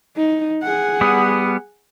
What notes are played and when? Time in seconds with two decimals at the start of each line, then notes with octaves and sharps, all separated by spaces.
0.17 D#4
0.63 G#4 F#5
1.01 G3 B3 D#6